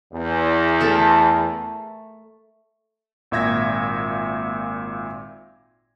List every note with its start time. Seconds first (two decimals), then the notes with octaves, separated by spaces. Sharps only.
0.13 E2
0.80 A3 A4 A#4
3.31 G#1 A#2 E5 G#6 A#6